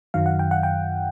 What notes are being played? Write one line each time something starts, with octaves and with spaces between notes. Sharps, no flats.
F#2 D#3 F#3 F5
F#5
G5
F#5
G5